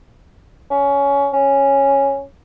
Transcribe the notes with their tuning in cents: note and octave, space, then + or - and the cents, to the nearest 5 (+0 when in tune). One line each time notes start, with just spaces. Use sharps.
C#4 +20
C#4 -5